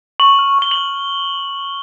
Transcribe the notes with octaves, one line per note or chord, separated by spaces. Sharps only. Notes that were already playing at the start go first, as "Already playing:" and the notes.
C#6 F#7
F6
C#6 G7
F#7
F6